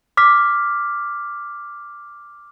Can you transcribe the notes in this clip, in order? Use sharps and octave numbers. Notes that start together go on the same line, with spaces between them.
D6 F6 B6